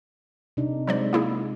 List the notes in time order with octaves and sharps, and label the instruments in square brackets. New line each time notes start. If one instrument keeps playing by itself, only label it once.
[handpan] C3 D4 D#4
[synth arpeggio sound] F#3 C5 D5 [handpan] G#3 D4
[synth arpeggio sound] A#3 E4 G#4